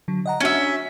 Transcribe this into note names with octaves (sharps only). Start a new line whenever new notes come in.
D3 F#3
D#5 F#5 A#5
C#4 D4 F#4 E5